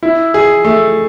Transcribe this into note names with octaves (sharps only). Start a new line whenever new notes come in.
E4
G#4
A3